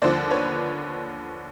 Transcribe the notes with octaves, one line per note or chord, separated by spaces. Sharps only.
D#2 D3 F3 C5 D5
B4 C#5